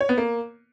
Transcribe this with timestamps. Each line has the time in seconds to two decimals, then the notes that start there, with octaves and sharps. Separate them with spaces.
0.01 C#5
0.09 B3
0.18 A#3